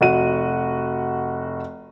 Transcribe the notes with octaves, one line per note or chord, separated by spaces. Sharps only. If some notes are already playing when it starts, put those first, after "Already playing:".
F1 F#4 D#7